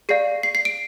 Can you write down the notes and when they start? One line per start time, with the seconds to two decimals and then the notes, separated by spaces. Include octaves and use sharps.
0.09 G#4 D5 F5 C7
0.43 C7
0.55 C7
0.65 D7